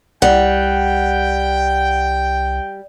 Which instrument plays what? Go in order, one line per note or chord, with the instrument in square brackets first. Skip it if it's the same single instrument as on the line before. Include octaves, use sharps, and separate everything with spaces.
[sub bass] C2 [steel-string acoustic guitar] G3 [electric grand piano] F#5 [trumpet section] G5